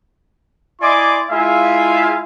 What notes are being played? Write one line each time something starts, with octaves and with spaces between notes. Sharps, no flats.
E4 D5 D#5 G#5 C6 D6
G#3 E4 F4 E5 F5 G#5